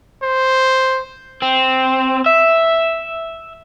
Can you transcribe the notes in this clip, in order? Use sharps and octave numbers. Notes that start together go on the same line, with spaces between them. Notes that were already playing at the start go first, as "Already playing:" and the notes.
C5
C4
E5